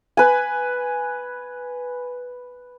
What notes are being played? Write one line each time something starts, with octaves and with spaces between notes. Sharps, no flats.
B4 G#5